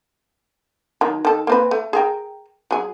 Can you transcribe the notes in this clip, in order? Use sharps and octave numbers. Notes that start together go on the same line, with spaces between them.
D#3 F#3
D#3 A4
A#3 C4 B4
A3
G#4 A#4 G5
F#3 G#4